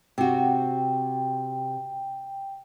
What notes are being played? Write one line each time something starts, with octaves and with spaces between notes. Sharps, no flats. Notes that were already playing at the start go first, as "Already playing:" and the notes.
C3 F#4 G5